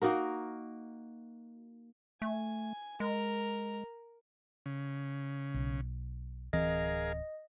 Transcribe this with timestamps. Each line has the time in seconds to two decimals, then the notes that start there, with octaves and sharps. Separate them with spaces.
0.02 A#3 D#4 F#4 A#4
2.22 A3 G#5
3.00 G#3 A#4 A#5
4.66 C#3
5.54 B1
6.53 D1 E3 C4 G#4 A#4 D#5 F5